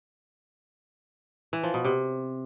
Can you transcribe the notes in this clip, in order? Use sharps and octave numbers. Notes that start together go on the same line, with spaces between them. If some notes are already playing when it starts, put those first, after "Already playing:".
E3
F3
B2
C3